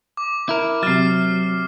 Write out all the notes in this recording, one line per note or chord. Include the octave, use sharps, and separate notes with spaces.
D6
E4 A#4
C3 F#3 F6 A6 C7